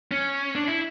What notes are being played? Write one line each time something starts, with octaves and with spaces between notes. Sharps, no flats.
C#4
D4
E4